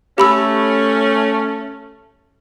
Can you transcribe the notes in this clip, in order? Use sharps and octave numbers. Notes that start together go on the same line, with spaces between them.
A3 C#4 G4 B5 E6